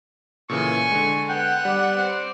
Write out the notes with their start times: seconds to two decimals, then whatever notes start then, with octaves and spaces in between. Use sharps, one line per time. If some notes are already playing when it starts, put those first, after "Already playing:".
0.49 A#2 C#3 E3 A4 G#5 C#6
0.91 D3 G#3
1.29 B3 F#5 G5
1.65 G3 D5
1.96 C4